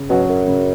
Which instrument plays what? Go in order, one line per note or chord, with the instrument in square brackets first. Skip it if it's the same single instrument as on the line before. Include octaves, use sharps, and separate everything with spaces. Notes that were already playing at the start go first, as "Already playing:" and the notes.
Already playing: [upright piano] C#3
[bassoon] B2 [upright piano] F#3 C#4 F#4
[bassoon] F#2
[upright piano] C#3